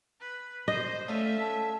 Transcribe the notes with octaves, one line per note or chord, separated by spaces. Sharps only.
B4
C5 D#5
A3 C#4 F4 A4 E5
A5